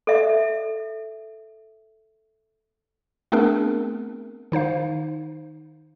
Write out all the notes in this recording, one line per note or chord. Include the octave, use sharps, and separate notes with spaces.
A4 E5
A3 B3 C4 D4 G#4 A#4
D#3 D#4 C5 F5